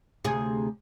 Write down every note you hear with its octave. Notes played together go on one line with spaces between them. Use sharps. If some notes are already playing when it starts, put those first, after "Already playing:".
D2 C3 G#4